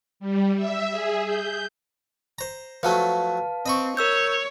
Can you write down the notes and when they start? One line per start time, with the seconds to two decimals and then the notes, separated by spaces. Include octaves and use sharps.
0.20 G3
0.57 E5
0.91 G#4
1.26 G6
2.39 C5 A#5
2.83 F3 F#3 A3 B4 F5 A5
3.66 C4 D#5 B5 C#6
3.97 A#4 C#5 E6 G6